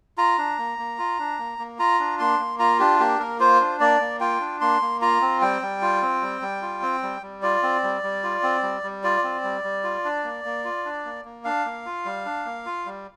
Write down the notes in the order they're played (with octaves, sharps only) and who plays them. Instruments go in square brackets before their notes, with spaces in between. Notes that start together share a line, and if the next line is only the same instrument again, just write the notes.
[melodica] F4 A#5
D4
A#3
A#3
F4
D4
A#3
A#3
F4 A#5
D4
A#3 C6
A#3
F4 A#5
D4 G4
A#3 G4
A#3 A#4
F4 C5
D4
A#3 D5
A#3
F4 G5
D4
A#3 C6
A#3
F4 A#5
C4
G3 G5
G3
F4
C4
G3
G3
F4
C4
G3
G3
F4 D5
C4
G3
G3
F4
C4
G3
G3
F4 D5
C4
G3
G3
F4
D4
A#3
A#3
F4
D4
A#3
A#3
D4 F5
A#3
F4
G3
D4
A#3
F4
G3